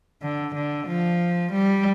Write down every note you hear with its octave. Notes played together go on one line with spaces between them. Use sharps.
D3
D3
F3
G3